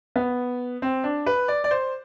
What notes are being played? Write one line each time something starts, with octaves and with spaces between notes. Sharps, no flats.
B3
C4
D4
B4
D5
D5
C5